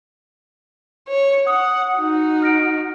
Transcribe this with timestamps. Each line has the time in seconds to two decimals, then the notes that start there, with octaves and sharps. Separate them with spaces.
1.08 C#5
1.47 F#5 D#6
1.96 D#4 F#4
2.42 F6 A#6 D7